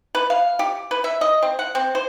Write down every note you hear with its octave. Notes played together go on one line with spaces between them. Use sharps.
B4
F5
G4
B4
E5
D#5
C4
F#5
C4
C5